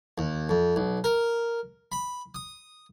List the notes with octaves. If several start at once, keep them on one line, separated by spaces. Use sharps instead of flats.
D#2
F2
B1
A#4
B5
D#6